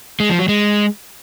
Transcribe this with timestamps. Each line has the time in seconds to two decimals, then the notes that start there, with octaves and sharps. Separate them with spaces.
0.20 G#3
0.29 F3
0.39 F#3
0.48 G#3